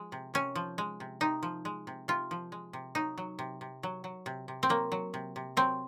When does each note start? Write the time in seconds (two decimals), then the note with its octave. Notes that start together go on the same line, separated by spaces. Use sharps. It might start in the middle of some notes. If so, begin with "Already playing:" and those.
Already playing: F3 G#3
0.12 C3
0.34 C3 C#4
0.55 F3
0.78 G#3
1.00 C3
1.21 C3 D#4
1.43 F3
1.65 G#3
1.87 C3
2.08 C3 F4
2.31 F3
2.52 G#3
2.73 C3
2.95 F#3 D#4
3.18 F#3
3.39 C3
3.61 C3
3.83 F#3
4.04 F#3
4.26 C3
4.48 C3
4.63 C4
4.69 F#3 A#3
4.92 F#3
5.14 C3
5.36 C3
5.57 F#3 C4